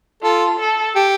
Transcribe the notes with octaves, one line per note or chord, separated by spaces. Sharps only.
F4 A4
A4
G4